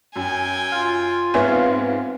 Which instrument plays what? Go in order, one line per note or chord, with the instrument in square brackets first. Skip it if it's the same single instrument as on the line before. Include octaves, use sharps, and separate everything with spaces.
[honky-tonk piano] F#2 [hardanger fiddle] G5 G#5
[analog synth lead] F4
[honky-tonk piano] G#2 B3 C#5 [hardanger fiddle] C4 [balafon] B4 E5 G#5